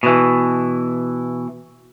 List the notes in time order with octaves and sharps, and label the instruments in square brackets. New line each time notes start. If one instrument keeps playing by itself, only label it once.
[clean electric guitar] B2 E3